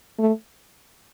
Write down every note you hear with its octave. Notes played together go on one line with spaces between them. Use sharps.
A3